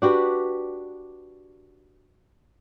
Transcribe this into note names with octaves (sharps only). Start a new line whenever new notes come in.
D4 F#4 G4 B4